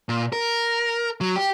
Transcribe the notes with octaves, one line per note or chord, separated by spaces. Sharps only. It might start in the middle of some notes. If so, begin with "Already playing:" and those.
A#2
A#4
F#3
G4